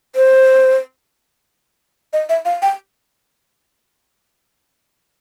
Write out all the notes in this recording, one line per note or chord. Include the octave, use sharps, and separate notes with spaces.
C5
D#5
E5
F5
G5